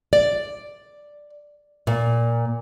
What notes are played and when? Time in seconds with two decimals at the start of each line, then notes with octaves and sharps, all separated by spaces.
0.13 D5
1.87 A#2